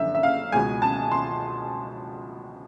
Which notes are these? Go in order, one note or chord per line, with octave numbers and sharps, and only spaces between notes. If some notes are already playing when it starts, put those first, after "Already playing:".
Already playing: F#2 D3 F3 E5
E5
F5
C#2 B2 G#3 G#5
A5
C6